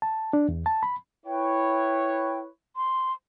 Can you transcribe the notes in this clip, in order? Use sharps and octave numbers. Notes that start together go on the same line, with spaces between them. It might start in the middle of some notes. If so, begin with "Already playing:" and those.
A5
D4
E2
A5
B5
E4 B4 C#5 G5
C6